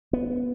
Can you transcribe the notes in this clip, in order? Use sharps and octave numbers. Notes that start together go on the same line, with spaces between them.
B3